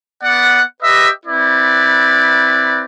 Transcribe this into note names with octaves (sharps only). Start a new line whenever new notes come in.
B3 D5 F#5
G4 B4 D#5 E5
C4 E4 B4 D5